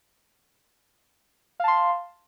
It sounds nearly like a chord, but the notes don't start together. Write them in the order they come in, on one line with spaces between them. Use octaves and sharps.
F5 A5 C6